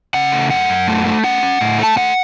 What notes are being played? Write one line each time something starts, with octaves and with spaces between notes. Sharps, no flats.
C#3 F#5
A3
F#2 F#5
F#2
A3
A3
C#4 F#5
C#4
A2
A3 A5
A3 F#5